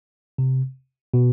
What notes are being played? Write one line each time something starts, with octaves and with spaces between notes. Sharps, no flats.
C3
B2